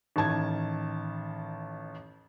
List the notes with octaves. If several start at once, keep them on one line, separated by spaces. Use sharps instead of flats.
A1 D#3 A5 G#6